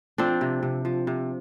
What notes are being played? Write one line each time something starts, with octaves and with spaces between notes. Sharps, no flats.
F3 C4 D4
C3
C3
F3
C3